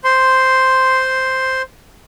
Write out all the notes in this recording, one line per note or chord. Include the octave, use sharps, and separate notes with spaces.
C5 C6